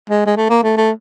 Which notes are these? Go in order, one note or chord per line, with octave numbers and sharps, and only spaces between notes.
G#3
G#3
A3
A#3
A3
A3